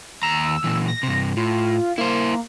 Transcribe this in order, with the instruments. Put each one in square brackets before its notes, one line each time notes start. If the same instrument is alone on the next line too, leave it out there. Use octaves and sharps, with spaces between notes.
[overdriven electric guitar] D#2 A#5 [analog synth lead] E6
[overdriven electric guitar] A#2 E3
[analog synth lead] A#6
[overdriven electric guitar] G2 C3
[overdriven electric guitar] A2 [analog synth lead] F4
[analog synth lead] A#3 [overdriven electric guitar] E4 C5